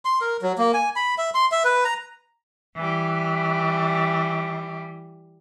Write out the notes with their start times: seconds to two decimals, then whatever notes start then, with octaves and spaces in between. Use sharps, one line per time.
0.05 C6
0.21 A#4
0.42 F#3
0.58 A#3
0.74 G#5
0.96 B5
1.18 E5
1.34 C6
1.52 E5
1.64 B4
1.85 A#5
2.75 E3 G3